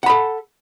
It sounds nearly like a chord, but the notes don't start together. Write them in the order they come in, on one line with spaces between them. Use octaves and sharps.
F#5 B5 A4